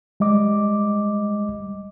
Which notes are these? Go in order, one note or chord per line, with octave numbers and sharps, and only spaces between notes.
G3 G#3 D#5 D6